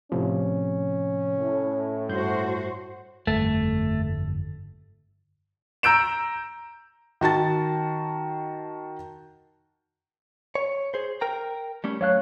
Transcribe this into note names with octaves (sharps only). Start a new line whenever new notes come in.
A2 C3 F3 C#4
A2
G2 F#4 C5 G6
G1 F2 A3
A#5 E6 G6 D7 E7
D#3 F#4 A5 A6
C#5
G#4 C5
A#4 G5 A#5
G3 A3 C#4
F#3 A3 C#5 F5 F#6